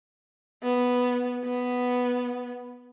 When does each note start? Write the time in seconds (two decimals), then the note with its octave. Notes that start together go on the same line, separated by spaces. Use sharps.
0.63 B3
1.44 B3